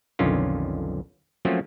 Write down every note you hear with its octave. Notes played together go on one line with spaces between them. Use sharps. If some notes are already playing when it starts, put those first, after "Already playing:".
B1 F2 D3 D#3 C#4 F4
F3 F#3 A3 A#3 C4 C#4